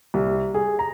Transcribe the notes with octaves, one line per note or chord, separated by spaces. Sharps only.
C2
G#4
A#5